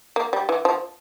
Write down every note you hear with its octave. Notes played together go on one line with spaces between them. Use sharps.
A#3
G3
E3
F3